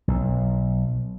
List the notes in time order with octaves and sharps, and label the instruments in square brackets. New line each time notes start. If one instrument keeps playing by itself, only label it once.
[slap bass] B1